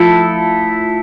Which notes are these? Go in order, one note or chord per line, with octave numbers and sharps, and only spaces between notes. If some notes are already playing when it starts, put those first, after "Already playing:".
Already playing: F3 A3 E4 A4